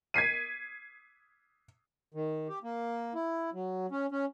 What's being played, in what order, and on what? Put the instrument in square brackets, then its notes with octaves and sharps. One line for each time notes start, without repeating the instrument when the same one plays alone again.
[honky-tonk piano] G#6 B6 C7 D#7
[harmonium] D#3
G4
A#3
E4
F#3
C#4
C#4